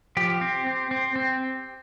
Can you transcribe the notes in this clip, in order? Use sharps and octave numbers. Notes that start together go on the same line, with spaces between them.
F3 G4
C4
C4
C4
C4